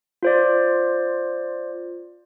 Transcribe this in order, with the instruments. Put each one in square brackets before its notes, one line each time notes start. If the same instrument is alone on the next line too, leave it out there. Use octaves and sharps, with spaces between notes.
[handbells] F4 C5 D5